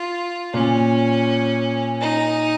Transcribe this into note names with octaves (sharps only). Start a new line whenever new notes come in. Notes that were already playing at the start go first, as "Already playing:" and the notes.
Already playing: F4
A#2 C#4
D#4